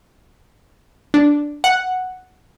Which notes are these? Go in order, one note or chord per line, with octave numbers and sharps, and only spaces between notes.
D4
F#5